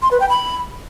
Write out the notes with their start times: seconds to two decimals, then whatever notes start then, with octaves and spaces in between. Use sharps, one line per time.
0.02 C6
0.11 B4
0.20 G5
0.29 B5